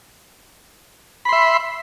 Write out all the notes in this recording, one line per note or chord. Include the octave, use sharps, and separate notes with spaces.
E5 B5 C6